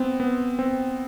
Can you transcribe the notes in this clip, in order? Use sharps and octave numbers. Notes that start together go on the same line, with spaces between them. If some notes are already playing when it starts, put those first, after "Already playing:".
Already playing: B3 C4
B3
C4